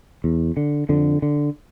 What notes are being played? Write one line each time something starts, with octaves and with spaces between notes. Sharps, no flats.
E2
D3
F2 D3
D3